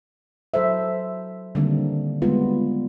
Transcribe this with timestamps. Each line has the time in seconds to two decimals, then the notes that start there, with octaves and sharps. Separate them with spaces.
0.54 F#3 A4 C5 E5
1.55 D3 D#3 G3 A#3 C4 D4
2.22 G3 G#3 B3 F4